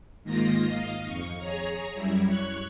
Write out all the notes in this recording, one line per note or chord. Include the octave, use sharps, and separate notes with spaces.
G#2 D#3 A#3 F4 A#6
D#5 F5
F2 C#6
G#4 C#5 A#5
F#2 G3 E4
C#5 C#6 F#6